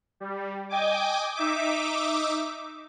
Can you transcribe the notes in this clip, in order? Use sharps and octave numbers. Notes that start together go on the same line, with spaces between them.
G3
D#5 G5 G#5 D6
D#4 E5 D6